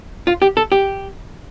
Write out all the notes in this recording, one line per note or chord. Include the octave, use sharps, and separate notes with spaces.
F4
G4
A4
G4